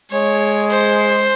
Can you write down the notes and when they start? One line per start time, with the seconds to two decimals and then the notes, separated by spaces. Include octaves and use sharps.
0.11 G#3 C#5
0.70 C5